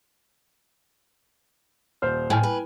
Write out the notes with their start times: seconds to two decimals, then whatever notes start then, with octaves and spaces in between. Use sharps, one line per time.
2.02 D#1 C5 F6
2.30 A2 G5 G#5 F6
2.43 B4